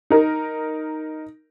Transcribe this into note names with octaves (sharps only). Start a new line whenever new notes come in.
D#4 A#4